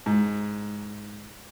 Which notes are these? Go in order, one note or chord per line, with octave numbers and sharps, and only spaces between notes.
G#2